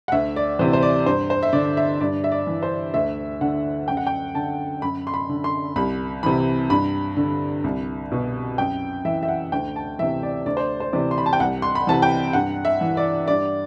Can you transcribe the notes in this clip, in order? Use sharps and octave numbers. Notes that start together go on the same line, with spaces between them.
F#5
D2 E5
D5
C3 E3 C5
C5
D5
G2 C5
C5
E5
D3 D5
E5
G2 D5
E5
D5
E3
C5
D2 E5
D3 F#5
F#2 G5
F#5
G5
D3 A5
F#2 B5
C6
B5
D3
C6
C2 B5
C3 E3 B5
G2 B5
D3
C2
B2
F#2 G5
E3 E5
E5
F#5
D2 G5
A5
C3 E3 E5
D5
D2 D5
C5
C5
C3 E3 D5
C6
B5
A5
G5
C2 F#5
C6
B5
C3 E3 A5
G5
G2 F#5
E5
E3
D5
G2 D5